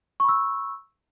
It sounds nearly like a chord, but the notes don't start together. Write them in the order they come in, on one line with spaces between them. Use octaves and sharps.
C#6 B5 E6